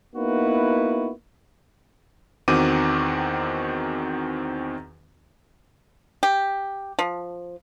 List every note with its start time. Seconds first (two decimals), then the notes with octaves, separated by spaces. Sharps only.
0.16 A#3 B3 D#4 E4 F#4 B4
2.48 E2 D#3 C4 F#4 D6 D#7
6.23 G4
6.99 F3